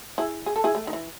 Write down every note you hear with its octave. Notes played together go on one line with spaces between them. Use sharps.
E4 G#4
G#4
A4
E4 G#4
A3
D#3
E3